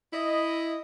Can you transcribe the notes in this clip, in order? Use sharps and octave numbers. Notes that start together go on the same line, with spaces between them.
E4 D#5